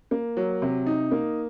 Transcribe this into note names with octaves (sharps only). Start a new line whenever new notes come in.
A#3
F#3
C3
D#4
A#3